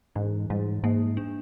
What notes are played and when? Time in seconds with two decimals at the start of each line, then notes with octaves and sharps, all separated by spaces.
0.16 G#2 E3
0.50 G#2 G3
0.83 G#2 A#3
1.17 D4